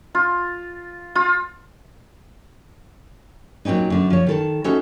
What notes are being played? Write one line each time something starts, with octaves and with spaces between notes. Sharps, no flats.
F4
F4
A#2 F#3 C4 C#4 D#4
F#2 D3
F3 C#5
D#3 A4 A5
C#4 D#4 F#4 A4 C5 E5